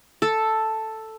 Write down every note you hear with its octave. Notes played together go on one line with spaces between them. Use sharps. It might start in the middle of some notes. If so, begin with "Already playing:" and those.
A4